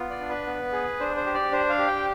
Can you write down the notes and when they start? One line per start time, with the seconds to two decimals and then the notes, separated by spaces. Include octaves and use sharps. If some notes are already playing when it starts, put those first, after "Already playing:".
Already playing: B3 F4
0.10 D5
0.20 D4
0.29 B4
0.46 B3
0.72 G#4
1.00 D4 C5
1.17 C5
1.26 G4
1.34 D5
1.52 D4 C5
1.70 F5
1.79 G4
1.87 G5